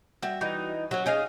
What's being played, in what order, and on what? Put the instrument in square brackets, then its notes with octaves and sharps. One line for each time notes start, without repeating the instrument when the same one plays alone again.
[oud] G3 F#4 [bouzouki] E5
[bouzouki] E3 D#4
[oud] F#3 C#4 [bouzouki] F#4
[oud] C#4 G#4 [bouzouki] D#4 D#5 F5